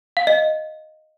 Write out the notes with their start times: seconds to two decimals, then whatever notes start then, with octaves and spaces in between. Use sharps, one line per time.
0.17 F5
0.27 D#5